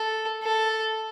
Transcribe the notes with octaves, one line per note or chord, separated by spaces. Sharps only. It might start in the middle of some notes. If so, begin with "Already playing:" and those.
Already playing: A4
A4